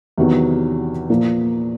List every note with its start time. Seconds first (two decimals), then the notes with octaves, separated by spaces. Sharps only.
0.17 E2 C3 D#3 F#3 B3
1.10 A#2 F3 A#3